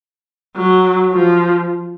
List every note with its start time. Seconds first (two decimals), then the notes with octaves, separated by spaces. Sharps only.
0.57 F#3
1.12 F3